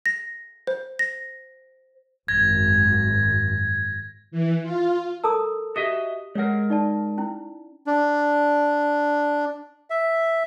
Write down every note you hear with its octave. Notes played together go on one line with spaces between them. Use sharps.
A#6
C5
A#6
G#1 F#2 G#6 A#6
E3
F4
A4 A#4 A5 A#5 D#6 E6
F#4 G4 D#5 E5 D#6
G#3 A#4 C#5 F#5
D#4 D5 A5
C#4 E4
D4
E5